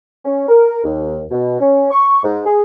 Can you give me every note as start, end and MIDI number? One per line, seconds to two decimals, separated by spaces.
0.25 0.45 61
0.49 0.84 70
0.84 1.21 39
1.31 1.56 47
1.60 1.86 61
1.91 2.20 85
2.24 2.40 44
2.46 2.63 68